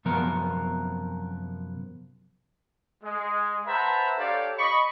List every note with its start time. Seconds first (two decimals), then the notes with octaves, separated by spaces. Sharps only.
0.05 F#2 C3 F3 B3 A#4
3.04 G#3
3.67 B4 C5 E5 F#5 A5 A#5
4.17 D4 G4 A4 C#5 D5 F5
4.58 D#5 B5 C#6